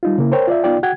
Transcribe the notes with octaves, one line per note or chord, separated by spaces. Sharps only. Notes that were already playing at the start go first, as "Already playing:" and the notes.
G3 D#4 F4
C#3 A#3 E4
A#4 C5 C#5 G5
F4 D5 E5
B3 D#4 F4 D5 G5
F#4 F#5 G5 G#6